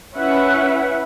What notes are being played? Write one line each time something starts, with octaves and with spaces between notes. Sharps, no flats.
C#4 E4 B4 E5 F#5